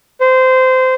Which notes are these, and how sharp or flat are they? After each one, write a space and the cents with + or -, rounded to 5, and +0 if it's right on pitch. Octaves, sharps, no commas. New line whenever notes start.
C5 -20